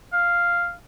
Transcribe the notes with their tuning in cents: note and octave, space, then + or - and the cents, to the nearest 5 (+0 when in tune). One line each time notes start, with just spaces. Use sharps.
F5 -5